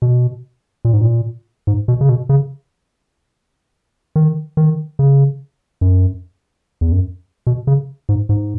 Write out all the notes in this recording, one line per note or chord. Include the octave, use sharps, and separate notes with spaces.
B2
A#2
G#2
A#2
G#2
B2
C#3
B2
C#3
D#3
D#3
C#3
F#2
E2
F#2
B2
C#3
G#2
G#2